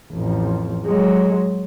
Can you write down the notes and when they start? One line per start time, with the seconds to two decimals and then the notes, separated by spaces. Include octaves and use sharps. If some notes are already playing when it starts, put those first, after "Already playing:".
0.12 A1 F2
0.85 F#3 G#3